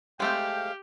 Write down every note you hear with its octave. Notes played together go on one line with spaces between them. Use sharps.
G#3 A3 C4 G4 F5 G5